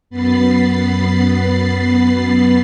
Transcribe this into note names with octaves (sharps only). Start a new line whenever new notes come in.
F#2 B3 B5 A6 C7